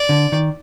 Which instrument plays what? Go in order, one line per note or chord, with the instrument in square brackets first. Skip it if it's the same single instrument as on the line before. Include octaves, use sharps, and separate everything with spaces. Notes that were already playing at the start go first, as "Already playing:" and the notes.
Already playing: [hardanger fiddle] D5
[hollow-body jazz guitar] D3
D#3